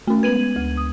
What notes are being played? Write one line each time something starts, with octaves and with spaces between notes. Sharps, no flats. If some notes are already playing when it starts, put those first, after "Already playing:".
A3 C#4
G#3 B3 B4 G#6 D#7 F#7
D2
D#6